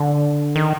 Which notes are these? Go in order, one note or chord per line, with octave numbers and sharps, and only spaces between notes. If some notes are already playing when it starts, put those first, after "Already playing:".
Already playing: D3
D#3